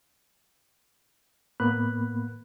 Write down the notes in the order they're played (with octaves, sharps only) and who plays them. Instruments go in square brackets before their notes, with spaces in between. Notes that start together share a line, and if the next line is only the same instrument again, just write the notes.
[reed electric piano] A2 A#3 B3 B5 F#6